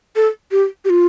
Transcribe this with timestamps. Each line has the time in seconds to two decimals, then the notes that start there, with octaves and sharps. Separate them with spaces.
0.16 A4
0.51 G4
0.85 G4
0.90 F4